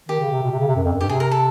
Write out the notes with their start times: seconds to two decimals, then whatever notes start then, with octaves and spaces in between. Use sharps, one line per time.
0.08 D#3 G4
0.20 C#3
0.31 C3
0.43 B2
0.51 C3
0.59 C#3
0.68 C3
0.76 F#2
0.84 F2
0.93 F#2
1.01 G2 G4
1.09 C3 G#4
1.20 A#4
1.31 A4